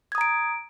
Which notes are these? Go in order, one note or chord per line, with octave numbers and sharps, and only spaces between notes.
A#5 D#6 G#6 D7